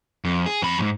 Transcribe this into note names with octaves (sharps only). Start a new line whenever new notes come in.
F2
G#4
F2 B5
F2 G#2